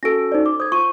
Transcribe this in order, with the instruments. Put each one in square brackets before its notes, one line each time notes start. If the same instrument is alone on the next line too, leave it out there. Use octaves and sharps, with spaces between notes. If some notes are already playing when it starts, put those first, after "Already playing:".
[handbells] C#4 F#4 A4 [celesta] A#6 D7
[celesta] D#4 C5 D5
D6
[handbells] C5 [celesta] D#6 G#6
[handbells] F4 [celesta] C#6 D#7